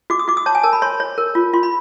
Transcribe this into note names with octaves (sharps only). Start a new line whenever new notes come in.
F#4 D6
D#6
F#4 D6
D#6
C#5 A5
G#5
A#4 A5
B5
C#5 C6
C#5
A#4
F4
F4 C6
B5